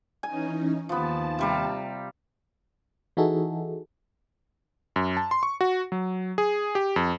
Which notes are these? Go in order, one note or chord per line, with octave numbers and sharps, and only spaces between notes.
E3 C#4 D#4 G#5
D#2 F3 B3 A5
C3 G3 A#5
E3 D#4 E4 F#4 G#4 A4
F#2
A5
C6
C#6
F#4
F#3
G#4
G4
F2